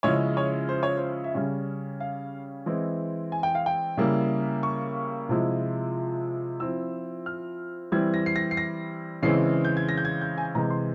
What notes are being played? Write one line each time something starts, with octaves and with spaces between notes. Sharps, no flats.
C#3 F3 G#3 C#4 E4 C#5
C#5
C5
C#5
C5
E5
C#3 G3 C#4 C#5
F5
E3 G#3 C4 E4
G#5
G5
F5
G5
C#3 G3 A#3 E4
C#6
C3 F3 G#3 E4
F3 C4 E4 E6
F6
E3 G3 C4 E4 G#6
A#6
C7
A#6
C7
A#6
C#3 E3 G#3 C4 E4 C7
G6
G#6
A#6
G6
G#6
G6
G#5
C3 E3 G#3 A#5
C6